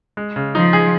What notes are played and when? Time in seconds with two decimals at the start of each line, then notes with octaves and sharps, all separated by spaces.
0.17 G#3
0.36 C#3
0.54 F3 D#4
0.73 G#4